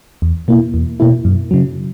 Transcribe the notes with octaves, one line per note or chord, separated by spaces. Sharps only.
E2
B2 A#3 E4
E2
B2 A#3 E4
F#2
C#3 F#3